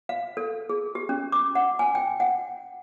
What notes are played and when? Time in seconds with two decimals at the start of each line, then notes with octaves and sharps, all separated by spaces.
0.09 F5
0.37 A4
0.70 G#4
0.95 G4
1.09 C#4
1.32 D6
1.55 F#5
1.79 G#5
1.95 G5
2.20 F#5